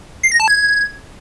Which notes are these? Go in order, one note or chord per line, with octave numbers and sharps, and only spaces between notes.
C7
A#6
A5
G#6